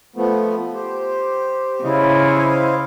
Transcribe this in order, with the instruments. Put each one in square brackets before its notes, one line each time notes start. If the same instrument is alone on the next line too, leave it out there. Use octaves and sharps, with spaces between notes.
[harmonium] F3 A3 B3
G4 C5
[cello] C#3 [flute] E4 [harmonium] C5 D#5 F5